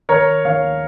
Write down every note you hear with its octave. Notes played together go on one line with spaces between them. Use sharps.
D#3 A#4 C#5
D#3 C#5 F5